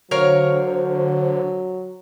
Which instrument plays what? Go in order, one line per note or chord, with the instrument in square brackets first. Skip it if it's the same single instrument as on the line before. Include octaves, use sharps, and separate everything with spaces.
[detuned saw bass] D3 [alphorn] F#3 [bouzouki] A#4 C#5 F5 [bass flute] C5